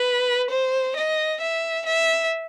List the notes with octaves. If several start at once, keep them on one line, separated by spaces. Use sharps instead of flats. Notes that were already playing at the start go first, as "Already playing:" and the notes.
Already playing: B4
C5
D#5
E5
E5